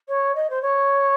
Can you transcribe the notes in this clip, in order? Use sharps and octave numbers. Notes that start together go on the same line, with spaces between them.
C#5
D#5
C5
C#5